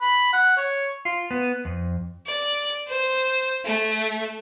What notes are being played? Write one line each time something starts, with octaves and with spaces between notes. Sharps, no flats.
B5
F#5
C#5
F4
B3
F2
D5
C5
A3